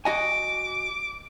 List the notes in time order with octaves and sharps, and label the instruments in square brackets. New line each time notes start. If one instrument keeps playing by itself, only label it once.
[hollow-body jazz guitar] F#4 D#5 G#5 [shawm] D6